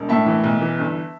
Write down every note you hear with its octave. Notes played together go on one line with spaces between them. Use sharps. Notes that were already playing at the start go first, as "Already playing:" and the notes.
Already playing: E1
A2 E5 A5
E3
B1
E3
G1